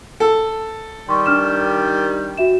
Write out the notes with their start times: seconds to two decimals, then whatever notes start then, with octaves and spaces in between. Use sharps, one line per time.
0.20 A4
1.09 D#3 G3 C6 C#6
1.26 D4 F6 E7
2.37 F#4 E5 E7